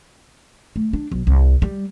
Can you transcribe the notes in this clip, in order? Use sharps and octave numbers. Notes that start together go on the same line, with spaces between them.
A3
D4
B1
C2
G3